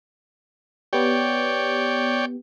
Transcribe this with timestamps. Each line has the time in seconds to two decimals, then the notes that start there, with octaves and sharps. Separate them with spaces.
0.93 B3 G4 C#5 D5 G5